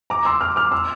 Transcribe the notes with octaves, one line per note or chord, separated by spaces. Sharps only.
A#5 D6
C6 E6
D6 F6
D6 F6
C6 E6